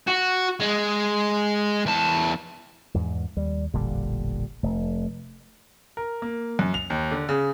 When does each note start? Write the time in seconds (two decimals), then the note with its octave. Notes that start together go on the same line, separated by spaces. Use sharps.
0.08 F#4
0.61 G#3
1.86 E2 A5
2.94 E2 G#2
3.37 D#2 G3
3.73 E1 A1 A#2 D3 G3
4.63 F1 A3
5.97 A#4
6.22 A#3
6.59 F#2
6.74 F7
6.90 D#2
7.12 D3
7.29 C#3